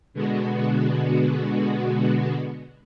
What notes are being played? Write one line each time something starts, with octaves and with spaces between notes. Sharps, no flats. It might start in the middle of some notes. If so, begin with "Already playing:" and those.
B2 D3 G#3 B3 F#4